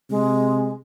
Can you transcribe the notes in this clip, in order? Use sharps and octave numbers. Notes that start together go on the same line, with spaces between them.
C3 G#3